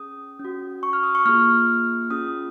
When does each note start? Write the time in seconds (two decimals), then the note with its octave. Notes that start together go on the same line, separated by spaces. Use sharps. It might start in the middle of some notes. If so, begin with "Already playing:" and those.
Already playing: C#4 G#4 D#6
0.39 C#4
0.44 F#4
0.83 C#6
0.93 F6
1.03 D#6
1.15 C#6
1.26 A#3 F4 G#4 F6
2.10 C#4 F4 G#4 D#6